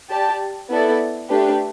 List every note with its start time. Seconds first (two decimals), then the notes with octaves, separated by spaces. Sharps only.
0.09 G4 D5 A5
0.70 B3 E4 A4 D5
1.30 A3 D4 G4 B4